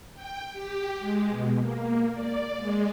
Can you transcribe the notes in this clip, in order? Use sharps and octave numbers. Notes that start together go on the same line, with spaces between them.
G5
G4
G#3
B2
A#3
D5
G#3